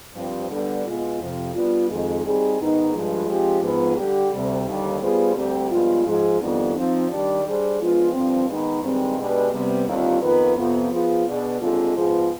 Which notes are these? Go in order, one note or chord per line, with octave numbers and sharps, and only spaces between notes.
G2 F3 C4 G4
D3 G3 B3 D4
B2 G#3 B3 F4
F2 C3 F3
G3 B3 D4 F4
F2 D#3 G#3
G3 C4 D#4 G#4
G#2 D#3 B3 D#4
G2 F3 G#3
F3 G#3 C4 G4
G#2 F3 B3
D3 G3 D4 G4
D2 C3 G3
D#2 D3 G3
G3 B3 F4 G#4 C5
D2 D3 G3 C4 G4
G2 F3 G#3 B3 F4
G#2 F3 G#3
F2 D#3 G3 B3 D4
F3 C4 D#4
D#3 G3 D4 G4 D5
G3 D4 G#4 C5
F3 G#3 B3 D4 F4
G2 D3 F3 C4
D#3 G#3 B3 D#4 B4
G2 D#3 G#3 C4
B2 G#3 D4 G4 B4
C3 G3 B3
D#2 D3 G3 C4 F4
F2 D#3 B3 F4 B4
F2 C3 F3 B3
F3 B3 F4 G#4 C5
B2 B3 D4 G#4 D5
D#2 D3 G#3 C4 F4
G#2 F3 B3 F4 G#4